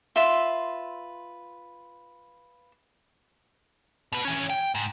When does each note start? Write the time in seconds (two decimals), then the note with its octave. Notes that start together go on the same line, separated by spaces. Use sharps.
0.16 F4 B4 E5 C6
4.12 B2 B4
4.25 E3 C#4
4.50 G5
4.75 G#2